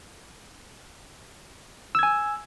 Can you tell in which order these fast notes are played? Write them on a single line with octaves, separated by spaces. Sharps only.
E6 G#6 G#5